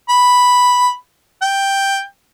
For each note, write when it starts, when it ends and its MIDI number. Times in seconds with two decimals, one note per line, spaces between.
0.09 0.92 83
1.42 2.02 79